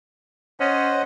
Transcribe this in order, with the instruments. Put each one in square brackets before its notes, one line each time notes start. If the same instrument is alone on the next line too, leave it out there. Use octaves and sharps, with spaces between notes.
[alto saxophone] C#4 [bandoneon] C5 D#5 F#5